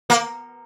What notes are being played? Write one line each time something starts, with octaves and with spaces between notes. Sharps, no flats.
A#3